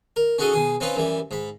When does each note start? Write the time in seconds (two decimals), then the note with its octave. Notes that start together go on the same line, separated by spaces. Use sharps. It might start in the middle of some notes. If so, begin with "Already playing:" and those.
0.16 A#4
0.38 C#4 D#4 F#4 G#4 A4 D#5
0.53 B2 G#4 D#6
0.80 C4 C#4 D#4 F4 B4
0.96 F#2 E3 G3
1.31 G#2 B5